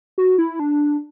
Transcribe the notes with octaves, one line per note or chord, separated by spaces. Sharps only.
F#4
E4
D4